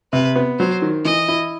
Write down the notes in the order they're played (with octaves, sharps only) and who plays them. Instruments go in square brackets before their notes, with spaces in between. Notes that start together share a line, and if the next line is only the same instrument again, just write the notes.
[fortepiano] C3 [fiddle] B4
[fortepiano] B3
[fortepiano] F#3 [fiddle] C5
[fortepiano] D#3
[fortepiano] E3 [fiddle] D#5
[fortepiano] E4